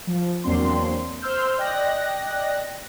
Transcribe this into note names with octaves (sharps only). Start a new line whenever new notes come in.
F3
E2 F#3 A#3 C4 D4 C6
C5 C6 E6 F6 G6
D5 D#5 G5 F#6 A#6